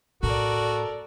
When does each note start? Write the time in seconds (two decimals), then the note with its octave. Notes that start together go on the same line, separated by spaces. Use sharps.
0.23 A2 F#4 A4 A#4 D5